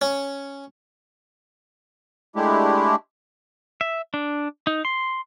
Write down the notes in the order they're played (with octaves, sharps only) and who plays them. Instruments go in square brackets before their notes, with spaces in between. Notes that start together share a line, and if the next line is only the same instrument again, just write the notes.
[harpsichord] C#4
[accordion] G#3 A3 D4 E4 G4
[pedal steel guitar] E5
D4
D#4
C6